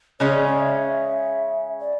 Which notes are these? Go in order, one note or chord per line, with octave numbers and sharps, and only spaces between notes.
C#3 G#3 C#4 C#5
D5
D5
E5
D5